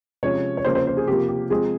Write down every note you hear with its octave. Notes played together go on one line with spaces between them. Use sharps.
C3 F3 G#3 C#4 C#5
C#5
C#3 F3 A#3 C#4 C5
C5
C5
G#4
C3 F3 A#3 G4
G4
F3 G#3 C4 G#4